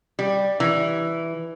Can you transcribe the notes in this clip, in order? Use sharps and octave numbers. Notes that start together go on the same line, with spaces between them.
G3
E3